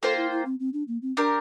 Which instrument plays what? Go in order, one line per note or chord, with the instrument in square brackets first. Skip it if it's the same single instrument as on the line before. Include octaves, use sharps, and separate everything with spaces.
[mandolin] A#3 F4 C5 G5 [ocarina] A4
[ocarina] E4
E4
C4
C4
D4
A#3
C4
[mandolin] D4 G4 A#4